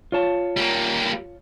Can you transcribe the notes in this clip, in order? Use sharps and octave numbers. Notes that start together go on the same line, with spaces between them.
F4 C#5 A5
G3 A#3